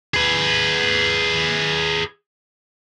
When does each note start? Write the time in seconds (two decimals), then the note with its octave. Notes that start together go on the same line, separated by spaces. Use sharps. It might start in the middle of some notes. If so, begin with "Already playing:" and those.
0.14 G#4 B4